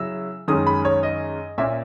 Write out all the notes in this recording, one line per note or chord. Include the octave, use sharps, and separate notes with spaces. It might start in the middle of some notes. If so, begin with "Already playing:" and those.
Already playing: C#3 F#3 C#4 E4 E6
F#2 D#3 G#3 C#4 D#6
B5
C#5
D#5
A#2 A#3 C#4 E5